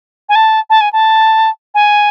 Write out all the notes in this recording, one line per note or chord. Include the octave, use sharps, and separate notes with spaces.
G#5
A5
A5
G#5
A5
G#5